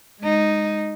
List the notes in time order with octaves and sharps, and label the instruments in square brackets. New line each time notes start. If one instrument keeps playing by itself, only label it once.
[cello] G#3 D#4